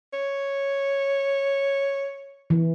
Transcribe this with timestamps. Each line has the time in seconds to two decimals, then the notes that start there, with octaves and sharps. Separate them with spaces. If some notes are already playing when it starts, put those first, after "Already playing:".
0.13 C#5
2.50 E3